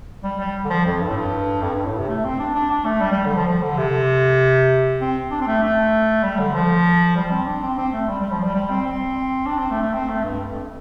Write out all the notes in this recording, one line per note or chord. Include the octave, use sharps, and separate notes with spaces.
G3
G3
D3
F3
F2
G2
A2
G2
F2
G2
A2
C3
A3
C4
D4
D4
D4
A3
G3
G3
D3
F3
F3
D3
C3
C4
D4
C4
A3
A3
G3
D3
F3
G3
C4
D4
C4
C4
A3
G3
G3
F3
G3
G3
C4
C4
D4
C4
A3
A3
C4
A3
G2
F2